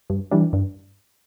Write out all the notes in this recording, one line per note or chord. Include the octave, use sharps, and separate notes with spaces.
G2
E3 G3 D4
G2